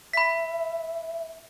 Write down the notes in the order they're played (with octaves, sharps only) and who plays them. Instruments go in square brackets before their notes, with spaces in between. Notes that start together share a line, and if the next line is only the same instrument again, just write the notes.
[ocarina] E5 [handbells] B5 B6